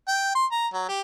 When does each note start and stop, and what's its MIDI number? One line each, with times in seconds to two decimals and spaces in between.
0.08 0.34 79
0.35 0.45 84
0.52 0.67 82
0.74 0.88 54
0.88 1.01 67